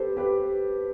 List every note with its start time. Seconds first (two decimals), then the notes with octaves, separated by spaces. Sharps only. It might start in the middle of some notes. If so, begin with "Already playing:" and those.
Already playing: G4 A4 B4 C5
0.17 G4 B4